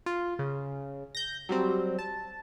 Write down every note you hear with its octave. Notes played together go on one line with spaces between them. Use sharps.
F4
C#3
G6 A#6
F#3 G3 C4
A5